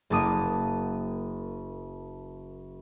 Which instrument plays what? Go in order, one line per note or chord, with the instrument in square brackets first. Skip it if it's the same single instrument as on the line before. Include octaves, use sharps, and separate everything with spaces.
[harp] F#1 A#3 A5 D6 D#6 D#7